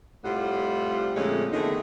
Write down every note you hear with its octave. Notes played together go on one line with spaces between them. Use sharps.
A2 C3 G3 F4 F#5
F2 A#2 D3 G#3 A3 C#4
E2 D3 D#3 A3 D#4 G#4